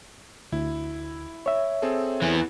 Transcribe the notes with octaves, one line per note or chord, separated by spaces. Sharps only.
D2 E4
C#5 E5
C4 G#4 A4
E2 E3